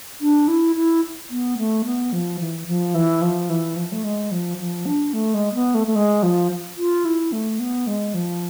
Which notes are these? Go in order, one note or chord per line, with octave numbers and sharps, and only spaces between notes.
D4
E4
E4
B3
A3
B3
F3
E3
F3
E3
F3
E3
F3
A3
G#3
F3
F3
D4
A3
G#3
B3
A3
A3
G#3
F3
F4
E4
A3
B3
G#3
F3